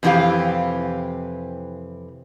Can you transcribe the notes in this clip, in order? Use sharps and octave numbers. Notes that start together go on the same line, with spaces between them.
F2 C3 E3 G#3 G4 F5